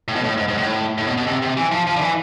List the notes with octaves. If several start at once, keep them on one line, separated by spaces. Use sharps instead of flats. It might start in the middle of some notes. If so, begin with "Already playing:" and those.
A2
B2
A2
G#2
G#2
A2
A2
B2
B2
C3
C3
E3
F3
F3
D3
E3